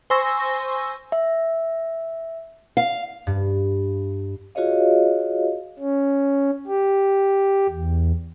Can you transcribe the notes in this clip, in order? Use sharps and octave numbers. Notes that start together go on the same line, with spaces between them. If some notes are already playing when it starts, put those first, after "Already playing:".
C5 G#5 C6 C#6 E6 A#6
E5
F5
G2
F4 F#4 G#4 C#5 D#5 F5
C#4
G4
E2